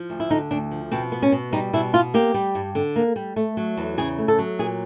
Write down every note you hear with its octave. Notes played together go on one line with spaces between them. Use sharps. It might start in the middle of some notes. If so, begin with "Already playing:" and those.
Already playing: F3
D2
E4
D3 D#4
D2 D4
F3
B2 C4
B3
C#4
B2
G3 D#4
B2 E4
B3 F4
A#3 G4
G3
G2
D3
A#3
G3
A3
F#3
E2
C#3 G#4
A3
A4
F#3
A#2 G#4